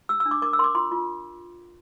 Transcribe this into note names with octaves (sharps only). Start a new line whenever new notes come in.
G4 E6
E6
D4
D6
A#4 D6
E6
A#4 C6
D6
F4 C6
F4